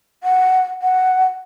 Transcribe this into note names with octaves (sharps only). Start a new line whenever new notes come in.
F#5
F#5